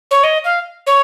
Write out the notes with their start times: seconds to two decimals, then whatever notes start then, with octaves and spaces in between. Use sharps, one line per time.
0.11 C#5
0.24 D#5
0.45 F5
0.87 C#5